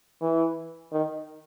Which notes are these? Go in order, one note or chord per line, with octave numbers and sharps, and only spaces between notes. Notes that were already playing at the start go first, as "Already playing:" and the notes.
E3
D#3